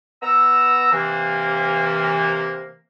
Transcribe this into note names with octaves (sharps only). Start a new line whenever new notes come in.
B3 A#5 E6
C3 E3 A#3